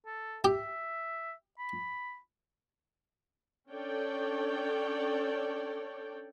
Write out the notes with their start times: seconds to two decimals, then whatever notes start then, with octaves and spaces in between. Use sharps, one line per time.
0.06 A4
0.44 G4 E5
1.58 B5
3.70 C#4 D4 A4 C#5 D5 G5